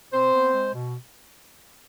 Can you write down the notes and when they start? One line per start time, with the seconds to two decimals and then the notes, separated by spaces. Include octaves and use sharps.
0.12 B2 C4 C5
0.33 B3
0.54 G#3
0.75 B2